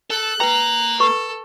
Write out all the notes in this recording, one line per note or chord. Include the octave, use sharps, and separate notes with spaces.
A4 F#6
A#3 B4 G5 A#5
A4 B4 C#6